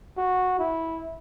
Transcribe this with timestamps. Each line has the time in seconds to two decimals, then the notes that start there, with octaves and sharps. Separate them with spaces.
0.17 F#4
0.59 E4